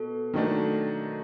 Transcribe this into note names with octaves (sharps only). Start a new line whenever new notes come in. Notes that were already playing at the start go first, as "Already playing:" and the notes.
Already playing: B2 A4
D#3 F#3 A3 D4